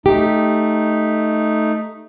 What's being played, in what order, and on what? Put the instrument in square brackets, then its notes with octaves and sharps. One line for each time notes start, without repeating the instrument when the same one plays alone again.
[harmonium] A3 D#4 [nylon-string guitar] G4